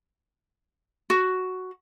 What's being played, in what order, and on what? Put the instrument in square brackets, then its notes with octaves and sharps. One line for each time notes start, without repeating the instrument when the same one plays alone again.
[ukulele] F#4